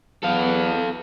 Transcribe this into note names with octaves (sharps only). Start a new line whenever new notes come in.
E2 B3 A4 F5